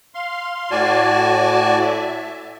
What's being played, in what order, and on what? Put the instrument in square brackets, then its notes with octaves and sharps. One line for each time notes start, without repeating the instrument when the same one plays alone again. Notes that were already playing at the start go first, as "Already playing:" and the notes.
[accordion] F5 C6
A2 F#4 D5 G#5 A5
E5